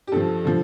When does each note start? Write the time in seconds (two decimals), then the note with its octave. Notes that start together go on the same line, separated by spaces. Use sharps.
0.07 G4
0.12 G2 F3 A4
0.45 D3 F3